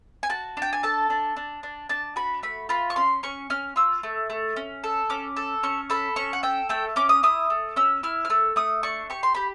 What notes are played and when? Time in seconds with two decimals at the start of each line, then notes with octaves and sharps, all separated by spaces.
0.23 G#5
0.29 F#4 A5
0.57 D4 G5
0.73 G#5
0.83 A4 A5
1.10 D4
1.36 D4
1.63 D4
1.89 D4 A5
2.16 F#4 B5
2.43 A3 B5
2.69 F4 B5
2.90 C#6
2.96 C#4 C6
3.23 C#4 C#6
3.50 C#4 F6
3.76 F4 E6
4.03 A3
4.30 A3
4.56 C#4
4.84 A4
5.10 C#4 D6
5.36 A4
5.63 C#4 C#6
5.90 A4 B5
6.16 C#4 C#6
6.33 F#5
6.43 A4 G5
6.69 A3 G5
6.96 C#4 D6
7.09 D#6
7.23 E4 D#6
7.50 A3
7.76 C#4 E6
8.03 E4 F6
8.25 F6
8.30 A3 E6
8.56 A3 D#6
8.83 D4 C#6
9.10 G4 C#6
9.23 C6
9.35 G4 B5